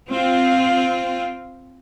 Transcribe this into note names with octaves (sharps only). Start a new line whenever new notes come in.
C4 F4